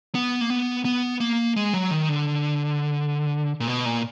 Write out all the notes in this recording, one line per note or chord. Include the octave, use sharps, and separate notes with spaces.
B3
A#3
B3
B3
A#3
G#3
F#3
D#3
D3
A#2
B2
A#2